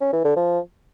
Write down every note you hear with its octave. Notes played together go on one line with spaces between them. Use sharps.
C#4
E3
D3
F3